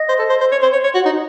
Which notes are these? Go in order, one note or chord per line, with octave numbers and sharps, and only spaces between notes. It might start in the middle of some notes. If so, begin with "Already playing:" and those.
Already playing: D#5
C5
A4
C5
C5
C#5
C5
C#5
C#5
F#4
D#4